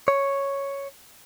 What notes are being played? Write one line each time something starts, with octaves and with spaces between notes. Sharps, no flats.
C#5